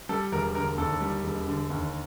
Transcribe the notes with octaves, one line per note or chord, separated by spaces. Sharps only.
G3 A4
E1 A#4
D3 A#4
D#2 A4
G3
E1
D3
D#2